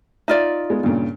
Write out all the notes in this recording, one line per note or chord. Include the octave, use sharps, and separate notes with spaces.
D#4 F4 D5 E5
G#3 B3
G2 A#2 C#3